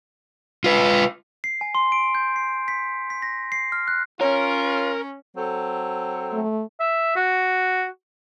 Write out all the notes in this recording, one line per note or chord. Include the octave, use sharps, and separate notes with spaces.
F4 B4
C7
G#5
C6
D7
G6
C7
B6
B6
A#6
C7
F6
F#6
C#4 F4 A#4 C#5
F#3 C4 A4
A3
E5
F#4